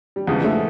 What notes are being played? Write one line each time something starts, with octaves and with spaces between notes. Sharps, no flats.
G3
E2 C#3 F3 G#3
A3